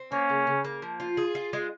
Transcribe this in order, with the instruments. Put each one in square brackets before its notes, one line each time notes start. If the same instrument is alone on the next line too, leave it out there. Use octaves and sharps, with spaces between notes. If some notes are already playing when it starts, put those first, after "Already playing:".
Already playing: [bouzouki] C4
[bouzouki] A#3 [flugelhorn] C#4
[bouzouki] C#3
C#3
A#3
F3
F4
G#4
F4
G#3